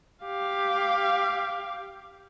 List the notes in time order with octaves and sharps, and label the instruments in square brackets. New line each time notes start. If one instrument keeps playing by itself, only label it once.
[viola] G4 F5